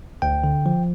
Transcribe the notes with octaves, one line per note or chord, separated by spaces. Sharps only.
D2 G5
D3
F3